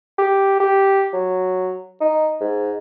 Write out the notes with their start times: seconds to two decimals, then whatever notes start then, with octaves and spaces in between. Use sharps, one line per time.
0.18 G4
0.60 G4
1.13 F#3
2.01 D#4
2.41 G#2